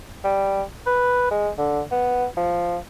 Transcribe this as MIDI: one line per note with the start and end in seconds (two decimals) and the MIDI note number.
0.24 0.62 55
0.87 1.30 71
1.31 1.50 56
1.58 1.82 50
1.92 2.26 59
2.37 2.78 53